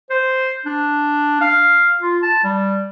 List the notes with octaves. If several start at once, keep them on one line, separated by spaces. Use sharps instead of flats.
C5
D4
F5
F4
A5
G3